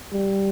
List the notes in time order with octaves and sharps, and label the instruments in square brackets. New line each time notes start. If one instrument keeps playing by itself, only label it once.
[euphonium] G3